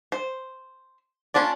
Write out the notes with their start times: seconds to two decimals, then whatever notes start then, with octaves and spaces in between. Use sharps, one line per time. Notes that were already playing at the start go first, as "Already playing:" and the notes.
0.12 C5
1.34 A#3 C#4 D4 F4 D5